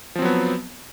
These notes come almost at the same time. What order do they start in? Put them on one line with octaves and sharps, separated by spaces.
F3 C4 F#3 B3